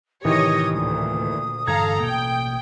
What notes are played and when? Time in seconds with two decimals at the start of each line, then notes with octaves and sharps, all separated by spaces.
0.25 A2 C3 D#3 E3 G4 C#5 D#5 D#6
0.75 D2 A#2 D#6
1.67 G2 D3 E3 A4 F5 A#5 G#6
2.00 A1 B2 A#3 G5